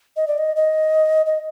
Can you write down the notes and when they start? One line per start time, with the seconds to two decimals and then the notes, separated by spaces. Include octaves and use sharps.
0.16 D#5
0.27 D5
0.38 D#5
0.56 D#5
1.26 D#5